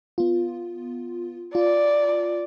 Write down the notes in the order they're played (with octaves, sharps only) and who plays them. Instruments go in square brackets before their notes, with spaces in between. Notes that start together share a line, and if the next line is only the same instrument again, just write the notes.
[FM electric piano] B3 F4
[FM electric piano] F4 [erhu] D5